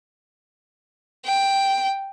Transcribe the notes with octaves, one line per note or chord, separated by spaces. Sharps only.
G5